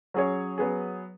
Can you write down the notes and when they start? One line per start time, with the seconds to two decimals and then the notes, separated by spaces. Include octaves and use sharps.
0.14 F#3 C#4 G#4 C#5
0.58 F#3 B3 G#4